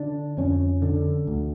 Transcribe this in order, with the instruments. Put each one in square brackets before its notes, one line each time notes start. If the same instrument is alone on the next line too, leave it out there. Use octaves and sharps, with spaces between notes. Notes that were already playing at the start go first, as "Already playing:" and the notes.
Already playing: [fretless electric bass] D3 D4
F2 C#4
D3
D2